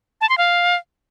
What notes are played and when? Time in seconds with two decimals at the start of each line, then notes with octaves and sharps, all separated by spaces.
0.21 A5
0.29 C6
0.38 F5